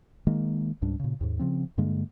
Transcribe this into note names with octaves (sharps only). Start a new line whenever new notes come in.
D#3 G#3 A#3
C#2 G#2 G3 D4
A#2 C#3
D#2 G#2
C#3 F3 C4
G2 D3 G#3 A#3